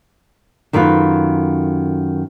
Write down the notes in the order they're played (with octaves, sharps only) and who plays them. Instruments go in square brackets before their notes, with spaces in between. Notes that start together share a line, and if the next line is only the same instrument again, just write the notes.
[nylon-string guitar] F#2 D#3 A3 E4 F4 B4